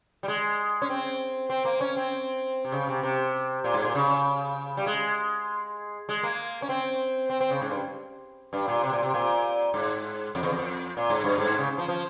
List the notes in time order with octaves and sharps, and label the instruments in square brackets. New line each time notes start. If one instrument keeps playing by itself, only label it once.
[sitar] G3
G#3
C#4
C4
C4
A#3
C#4
C4
C3
C#3
C3
C3
A#2
G#2
A#2
C#3
G3
G#3
G#3
A#3
C#4
C4
C4
C4
C#3
G#2
G2
G2
A#2
C3
A#2
C3
A#2
G#2
F2
E2
F2
A#2
G#2
G2
G#2
C#3
F3
F3